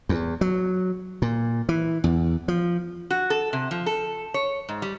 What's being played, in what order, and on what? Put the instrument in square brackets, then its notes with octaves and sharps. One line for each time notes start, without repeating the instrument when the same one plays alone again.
[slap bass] E2
F#3
A#2
E3
E2
F3
[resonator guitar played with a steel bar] F#4
A4
C3
F3
A4
C#5
G#2
G3